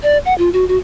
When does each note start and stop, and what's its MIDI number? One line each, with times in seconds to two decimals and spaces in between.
0.03 0.18 74
0.26 0.34 78
0.38 0.49 65
0.53 0.67 66
0.68 0.77 66